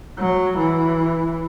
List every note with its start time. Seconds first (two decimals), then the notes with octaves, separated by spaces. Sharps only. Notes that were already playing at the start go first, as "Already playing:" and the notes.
0.19 F#3
0.58 E3